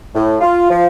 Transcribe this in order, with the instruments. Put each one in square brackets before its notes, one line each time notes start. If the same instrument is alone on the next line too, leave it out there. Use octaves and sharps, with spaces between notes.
[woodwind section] A2
F4
F3